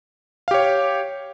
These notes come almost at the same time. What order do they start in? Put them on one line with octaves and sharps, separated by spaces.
F5 G4 C#5